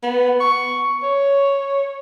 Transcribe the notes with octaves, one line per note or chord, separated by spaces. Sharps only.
B3
C#6
C#5